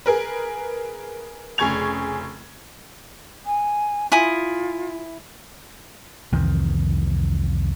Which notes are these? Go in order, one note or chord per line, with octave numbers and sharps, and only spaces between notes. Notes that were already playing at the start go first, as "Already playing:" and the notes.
G#4 A#4 B4
F1 C#3 G#4 C#6 G#6 F7
G#5
E4 F4 G#5 D#6
C2 F2 D#3 E3